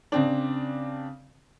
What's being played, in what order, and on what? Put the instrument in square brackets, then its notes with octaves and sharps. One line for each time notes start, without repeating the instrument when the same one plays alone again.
[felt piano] C#3 C4 D4